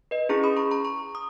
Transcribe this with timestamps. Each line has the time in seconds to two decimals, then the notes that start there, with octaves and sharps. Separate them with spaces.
0.11 B4 D#5
0.29 C#4 E4 G#4 A#5 C#6
0.44 B5 D#6
0.57 A#5 C#6
0.71 A#5 C#6
0.85 A#5 C#6
1.15 D#6